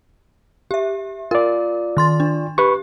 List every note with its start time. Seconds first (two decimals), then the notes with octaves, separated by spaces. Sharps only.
0.71 G4 E5
1.31 F4 A#4 D5
1.97 D#3 C6 A6
2.20 D4
2.58 G4 B4 C#6